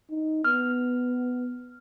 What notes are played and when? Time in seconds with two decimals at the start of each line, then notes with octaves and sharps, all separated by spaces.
0.10 D#4
0.44 B3 F6